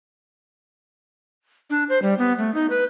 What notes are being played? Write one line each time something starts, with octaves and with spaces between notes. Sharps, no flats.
D4
C5
G3
B3
A3
D#4
B4